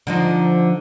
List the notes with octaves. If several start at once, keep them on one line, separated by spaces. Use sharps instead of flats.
D3 F3 D#4